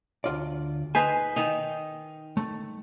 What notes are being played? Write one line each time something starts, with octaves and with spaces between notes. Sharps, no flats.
D2 F4 D5
D#4 B4 C5 G#5
D#3 D#4
A3